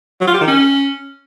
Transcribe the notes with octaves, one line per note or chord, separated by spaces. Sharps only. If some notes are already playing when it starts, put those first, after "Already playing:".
F#3
F4
G4
D#3
C#4